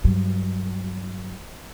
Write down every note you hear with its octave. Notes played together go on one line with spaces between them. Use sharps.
G2 F#3